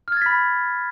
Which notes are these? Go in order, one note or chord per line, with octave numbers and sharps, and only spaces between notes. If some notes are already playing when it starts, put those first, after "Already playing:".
B5 F6 G#6 A6 B6